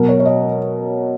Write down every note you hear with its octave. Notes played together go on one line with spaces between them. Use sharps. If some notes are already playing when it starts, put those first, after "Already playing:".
Already playing: B2 F#3 A#4
C#5
C#5
D#5